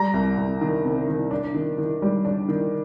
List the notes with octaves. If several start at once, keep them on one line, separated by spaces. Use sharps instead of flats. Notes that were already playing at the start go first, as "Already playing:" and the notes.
Already playing: G3 A#5
C2
C2
D#3
C3
D#3
D4
D#3
D#3
G3
D4
D#3